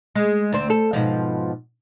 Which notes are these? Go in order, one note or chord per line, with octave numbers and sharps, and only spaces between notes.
G#3
D2 C4
A4
G#2 B2 F3